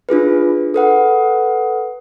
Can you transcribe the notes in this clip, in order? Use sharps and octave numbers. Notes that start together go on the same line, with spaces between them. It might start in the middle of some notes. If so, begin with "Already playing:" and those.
D4 F4 G#4 B4
A4 B4 F#5